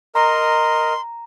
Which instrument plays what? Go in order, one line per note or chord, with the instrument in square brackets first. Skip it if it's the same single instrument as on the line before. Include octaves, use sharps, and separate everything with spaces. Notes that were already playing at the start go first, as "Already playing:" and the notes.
[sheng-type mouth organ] A#4 D#5 [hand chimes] A#5 [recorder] C6